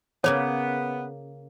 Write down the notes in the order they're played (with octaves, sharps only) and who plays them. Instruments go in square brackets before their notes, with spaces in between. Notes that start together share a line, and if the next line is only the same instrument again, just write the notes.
[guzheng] C#3 A#3 G#4 [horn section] B3 [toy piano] C#5